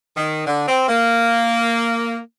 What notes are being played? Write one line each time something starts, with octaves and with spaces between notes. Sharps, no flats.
D#3
D3
C4
A#3